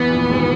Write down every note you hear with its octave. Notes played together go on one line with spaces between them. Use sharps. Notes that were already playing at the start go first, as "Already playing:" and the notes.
Already playing: E2 E3 B3
A#1 A#2
G#1 G#2